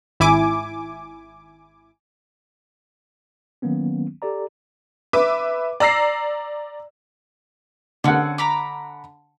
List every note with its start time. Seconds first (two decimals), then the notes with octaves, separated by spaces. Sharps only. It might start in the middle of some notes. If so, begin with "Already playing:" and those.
0.20 G#1 E4 G#5 D6
3.62 D#3 F#3 A#3 B3 C#4
4.22 G4 A4 D5 A#5
5.13 B4 E5 D6
5.80 D5 A#5 E6 A#6 C7
8.04 D3 C4 C#4 F#5
8.38 A#5 B5 D6